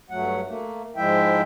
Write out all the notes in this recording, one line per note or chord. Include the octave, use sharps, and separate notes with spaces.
G2 F#3 A3 F#5
A3 A#3
G#2 F3 G#3 E4 E5 G5